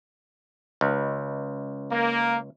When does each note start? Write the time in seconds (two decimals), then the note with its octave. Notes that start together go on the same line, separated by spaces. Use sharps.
0.81 C#2
1.92 A#3